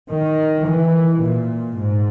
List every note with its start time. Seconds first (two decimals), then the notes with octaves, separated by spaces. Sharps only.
0.11 D#3
0.67 E3
1.23 A#2
1.79 G#2